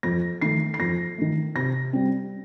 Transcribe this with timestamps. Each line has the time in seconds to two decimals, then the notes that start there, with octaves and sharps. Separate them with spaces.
0.03 F2 A#6
0.41 D#3 A3 C7
0.74 C7
0.79 F2 A#6
1.18 D#3 A3
1.55 C3 A#6
1.93 G3 C4